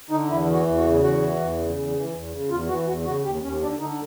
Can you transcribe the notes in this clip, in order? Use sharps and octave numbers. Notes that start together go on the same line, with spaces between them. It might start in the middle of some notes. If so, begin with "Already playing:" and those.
D3 D#4
E2 E4
E3
F#4
E2
F#4
C#3
E2 F#4
E3
E2
C#3
E2
E3
E2
C#3
E2 F4
E3 F#4
E2 F#4
C#3 F#4
D#2 G4
D#2 C#4
D3 D4
D3 D#4